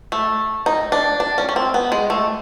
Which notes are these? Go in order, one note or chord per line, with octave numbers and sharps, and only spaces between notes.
A3
D#4
D4
D4
C#4
C#4
C4
B3
G#3
A3